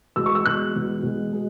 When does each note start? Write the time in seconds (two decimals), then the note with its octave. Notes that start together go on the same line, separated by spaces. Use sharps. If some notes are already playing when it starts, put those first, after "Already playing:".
0.16 E2 B2 G#3 E6
0.26 C#6
0.35 E6
0.45 E2 B2 G#3 F#6
0.74 E2 B2 G#3
1.03 E2 B2 G#3
1.33 B2 G#3